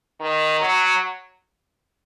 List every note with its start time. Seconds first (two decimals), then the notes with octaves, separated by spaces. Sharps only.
0.20 D#3
0.61 F#3